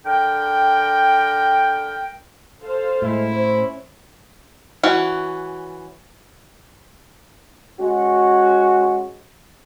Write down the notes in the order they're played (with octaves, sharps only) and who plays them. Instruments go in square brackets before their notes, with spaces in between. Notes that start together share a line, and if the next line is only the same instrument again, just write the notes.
[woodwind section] D3 A#4 G5
[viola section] A4 C5 F5
[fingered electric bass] A2 [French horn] G#3 [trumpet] E4
[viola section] C#4 [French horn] C5
[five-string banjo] E3 C#4 F#4
[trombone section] G#3 C#4 F#4